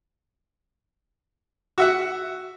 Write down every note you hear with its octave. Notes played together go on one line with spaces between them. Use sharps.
F#4 E5 F#5